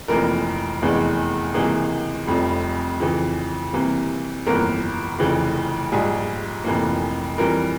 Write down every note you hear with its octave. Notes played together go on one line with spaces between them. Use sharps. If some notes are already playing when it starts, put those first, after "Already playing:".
F1 F2 E3 A#3 A#4
F1 E2 E3 G#3
C#2 C3 E3 A#3 G#4
F1 F2 C3 G3
F2 C#3 E3
C2 C3 E3 A#3
G1 F2 E3 A#3 A#4
F1 F2 C#3 E3
A#1 G#2 G3 G#4
F1 F2 E3 A#3
F2 E3 G3 A#4